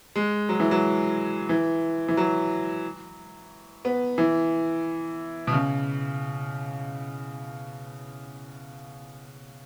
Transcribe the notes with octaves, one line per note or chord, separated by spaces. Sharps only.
G#3
F#3
E3
F#3
E3
E3
F#3
B3
E3
B2
C#3